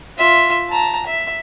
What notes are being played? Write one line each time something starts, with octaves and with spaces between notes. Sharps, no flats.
F4 E5
A5 A#5
E5